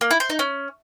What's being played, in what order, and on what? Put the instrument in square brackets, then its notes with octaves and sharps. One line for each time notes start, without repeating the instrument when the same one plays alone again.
[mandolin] A#3
E4
C5
D#4
C#4